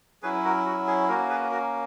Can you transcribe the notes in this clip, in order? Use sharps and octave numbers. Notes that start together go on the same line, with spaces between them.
F#3 C#4 E4 G#4 B4
F#4 A#4
F#4
G#4
A#3 C#4 F#4 A#4
G#4 B4
F#4 A#4